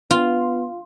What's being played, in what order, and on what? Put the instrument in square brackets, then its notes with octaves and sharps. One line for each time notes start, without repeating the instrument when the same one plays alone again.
[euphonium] B3 [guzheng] F4